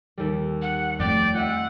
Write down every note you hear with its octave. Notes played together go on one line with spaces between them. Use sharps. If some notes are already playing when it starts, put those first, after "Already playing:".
D#2 G3
F#5
F2 A3 D5 G5
F4 D#5 E5 F#5